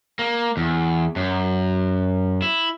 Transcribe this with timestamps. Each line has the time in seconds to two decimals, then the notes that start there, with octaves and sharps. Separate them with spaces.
0.19 A#3
0.57 E2
1.16 F#2
2.42 E4